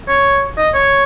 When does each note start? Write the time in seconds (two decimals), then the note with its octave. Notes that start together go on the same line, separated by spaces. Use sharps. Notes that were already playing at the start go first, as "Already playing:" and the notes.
0.08 C#5
0.57 D#5
0.74 C#5